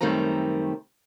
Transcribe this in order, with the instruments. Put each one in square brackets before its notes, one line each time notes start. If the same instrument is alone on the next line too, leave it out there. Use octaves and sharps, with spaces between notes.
[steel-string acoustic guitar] F#2 D#3 G3 A3 C4 A#5